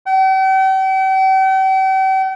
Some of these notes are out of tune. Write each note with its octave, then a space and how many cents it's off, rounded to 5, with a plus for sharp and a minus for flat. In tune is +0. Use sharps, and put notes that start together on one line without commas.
G5 -45